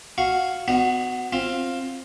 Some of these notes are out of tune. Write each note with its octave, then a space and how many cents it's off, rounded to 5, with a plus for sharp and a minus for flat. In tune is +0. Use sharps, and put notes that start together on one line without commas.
F#4 +0 F5 +0 C#6 -5
B3 +35 D#4 -40 F#4 +0
C4 +15 F4 +0